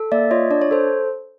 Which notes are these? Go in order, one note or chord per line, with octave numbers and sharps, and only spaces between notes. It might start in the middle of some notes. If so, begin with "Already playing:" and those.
Already playing: A4
A#3 D5 E5
F4 C#5 D#5
D4 D5
C#5
A4 C5